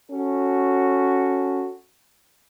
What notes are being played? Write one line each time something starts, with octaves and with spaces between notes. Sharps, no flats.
C#4 F#4 A4